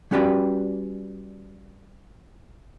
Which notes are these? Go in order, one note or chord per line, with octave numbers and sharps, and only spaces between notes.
G3 C#4 F#4 G4 B4 D5